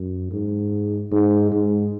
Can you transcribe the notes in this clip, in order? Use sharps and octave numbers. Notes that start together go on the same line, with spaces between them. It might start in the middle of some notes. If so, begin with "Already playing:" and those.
Already playing: F#2
G#2
G#2
G#2